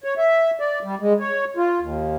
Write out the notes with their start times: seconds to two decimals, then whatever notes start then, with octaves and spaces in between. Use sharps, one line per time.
0.04 C#5
0.18 E5
0.60 D5
0.83 G3
1.00 G#3
1.20 C#5
1.57 F4
1.79 D#2